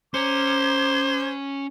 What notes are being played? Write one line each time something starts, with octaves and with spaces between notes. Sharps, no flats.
C#4 C5 A#5 D6 G#6